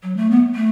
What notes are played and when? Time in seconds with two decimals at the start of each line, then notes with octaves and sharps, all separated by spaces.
0.03 F#3
0.17 A3
0.31 B3
0.55 A3